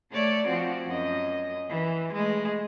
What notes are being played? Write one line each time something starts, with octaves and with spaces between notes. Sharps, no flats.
A3 C#5 D5
F3 C4 F#4
F#2 D#5
E3
G#3 A3